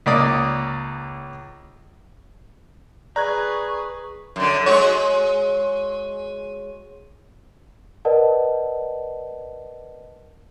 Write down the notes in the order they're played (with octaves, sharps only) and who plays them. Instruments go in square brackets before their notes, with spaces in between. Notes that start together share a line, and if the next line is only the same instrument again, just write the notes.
[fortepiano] C#2 A#3 D5 D#6
[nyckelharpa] G#4 B4 [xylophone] D5 [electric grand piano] A#5 F#6 G#6 [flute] C#6
[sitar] F#2 D3
G#3 F#4 C#5
[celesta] A#4 B4 D5 D#5 F#5 A5